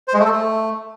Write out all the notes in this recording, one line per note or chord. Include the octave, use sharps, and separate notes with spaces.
C5
G#3
A3
A4
A3